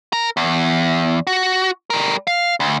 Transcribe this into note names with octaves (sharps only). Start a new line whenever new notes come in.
A#4
E2
F#4
G3 A#4
F5
D2